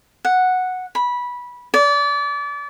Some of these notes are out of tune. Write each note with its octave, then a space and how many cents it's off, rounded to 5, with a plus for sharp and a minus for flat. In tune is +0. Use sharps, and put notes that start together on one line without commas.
F#5 -5
B5 -15
D5 -30